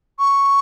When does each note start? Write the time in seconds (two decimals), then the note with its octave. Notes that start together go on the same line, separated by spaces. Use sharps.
0.19 C#6